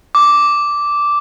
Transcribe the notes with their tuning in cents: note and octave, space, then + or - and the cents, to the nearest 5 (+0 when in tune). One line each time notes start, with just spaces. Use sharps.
D6 -5